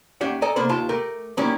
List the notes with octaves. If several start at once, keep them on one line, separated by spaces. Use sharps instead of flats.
D#2 C#4 D4 G4 E5 F#5
A4 D5 D#5 G#5 A#5
C2 A#3 D4 A4 C5 B5
D#2 F4 E5 A5 C6
A3 G4 A#4
D#3 F#3 G3 A#3 C#4 E4